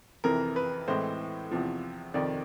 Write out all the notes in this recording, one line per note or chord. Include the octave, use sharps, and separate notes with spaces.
F2 C3 E3 A#4
B4
A2 E3 G#3 C4 C5
E2 C3 F3
F2 C3 D#3 D5